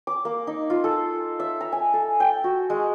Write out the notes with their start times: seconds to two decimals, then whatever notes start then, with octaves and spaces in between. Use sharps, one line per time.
0.07 D6
0.25 A#3
0.47 D#4
0.70 F4
0.84 A4
1.40 E5
1.61 A#5
1.72 G#5
1.93 A4
2.20 G5
2.44 F#4
2.70 G#3